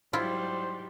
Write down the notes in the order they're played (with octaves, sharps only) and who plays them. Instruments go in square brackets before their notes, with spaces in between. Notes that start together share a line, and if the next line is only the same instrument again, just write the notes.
[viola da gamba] G#2 F#3 G3 [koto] E4 F4 [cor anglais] C5